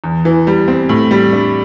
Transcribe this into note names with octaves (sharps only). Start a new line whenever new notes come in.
E2
E3
G3
C4
A2
G3
D4